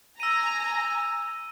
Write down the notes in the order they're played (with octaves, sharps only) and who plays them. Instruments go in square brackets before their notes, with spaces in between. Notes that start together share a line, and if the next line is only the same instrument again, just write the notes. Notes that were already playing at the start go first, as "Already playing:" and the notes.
[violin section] G#5 A#5 [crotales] E6 D#7